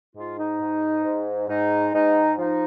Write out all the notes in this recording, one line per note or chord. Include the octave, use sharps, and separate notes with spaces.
G#2 F4
D#4
G#2
G#2
G#2 D#4
G#2 D#4
F3 D#4